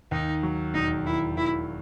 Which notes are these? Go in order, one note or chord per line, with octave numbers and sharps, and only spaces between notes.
D#2 D#4
F#3
E1 D#4
D#3 E4
D#2 E4